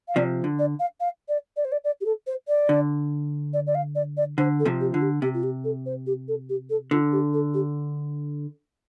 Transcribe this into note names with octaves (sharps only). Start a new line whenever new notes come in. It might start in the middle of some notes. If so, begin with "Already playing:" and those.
F5
C3 F3 D5
D3
D5
F5
F5
D5
D5
C5
D5
D5
G4
A4
C5
D5
D3
D5
D5
F5
D5
D5
D3 C5
A4
C3 F3
G4
D3 F4
G4
C3 G4
F4
G4
A4
C5
G4
A4
G4
A4
D3 F4
G4
A4
G4